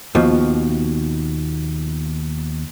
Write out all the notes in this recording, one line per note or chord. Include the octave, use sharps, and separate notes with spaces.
D#2 B2 F3